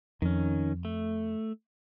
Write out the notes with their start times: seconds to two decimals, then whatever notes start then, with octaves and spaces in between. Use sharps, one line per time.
0.22 F2 D#3 C#4
0.85 A3